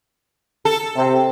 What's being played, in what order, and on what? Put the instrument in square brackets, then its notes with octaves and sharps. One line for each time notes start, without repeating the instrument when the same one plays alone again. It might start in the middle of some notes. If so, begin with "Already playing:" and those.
[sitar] A4
[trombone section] C3 C4